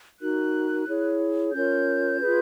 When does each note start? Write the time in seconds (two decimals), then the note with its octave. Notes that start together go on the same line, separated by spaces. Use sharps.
0.20 D#4 F#4 A#4 F#6
0.87 E4 G#4 C#5
1.53 C#4 F4 A#4 C#5 G6
2.20 F4 G#4 B4